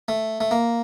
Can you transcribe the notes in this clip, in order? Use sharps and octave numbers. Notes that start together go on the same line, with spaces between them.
A3
A3
A#3